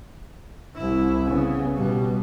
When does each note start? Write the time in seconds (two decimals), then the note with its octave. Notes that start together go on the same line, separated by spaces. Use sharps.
0.76 C2 E4
1.26 C#3 B3
1.77 B2 G3